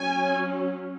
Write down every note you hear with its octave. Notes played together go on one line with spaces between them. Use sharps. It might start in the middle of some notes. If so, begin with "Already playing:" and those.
Already playing: F#3 C#4 G#5